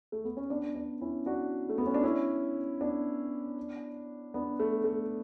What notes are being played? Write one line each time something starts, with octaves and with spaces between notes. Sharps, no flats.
A3
B3
C#4
B3 D4
B3 D4
C#4 E4
D4 F#4
A3
B3
C#4
D4
C#4 E4
B3 D4
B3 D4
A3
A3